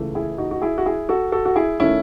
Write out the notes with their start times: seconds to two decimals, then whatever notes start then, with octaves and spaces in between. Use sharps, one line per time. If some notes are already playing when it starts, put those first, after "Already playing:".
Already playing: C#2 C#3 E3 A3
0.15 E4 G#4
0.38 D#4 F#4
0.51 F#4
0.62 E4 G#4
0.78 F#4
0.86 E4 G#4
1.09 F#4 A4
1.32 F#4 A4
1.45 F#4
1.56 E4 G#4
1.80 D#3 A3 C#4 E4